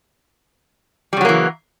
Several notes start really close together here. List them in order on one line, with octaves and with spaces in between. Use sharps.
G3 C#3 F#3 A#3 E3